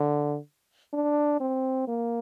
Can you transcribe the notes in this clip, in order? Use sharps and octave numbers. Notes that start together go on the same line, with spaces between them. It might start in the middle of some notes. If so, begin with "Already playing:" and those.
Already playing: D3
D4
C4
A#3